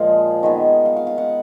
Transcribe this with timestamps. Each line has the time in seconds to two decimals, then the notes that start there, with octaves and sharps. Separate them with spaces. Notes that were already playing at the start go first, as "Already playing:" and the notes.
Already playing: A#2 F3 G#3 D#5 F5
0.43 D#3 G#3 B3
0.85 F5
0.96 F5
1.07 F5
1.18 F#5